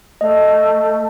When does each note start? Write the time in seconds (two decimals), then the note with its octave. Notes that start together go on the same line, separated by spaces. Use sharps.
0.21 A3 D#5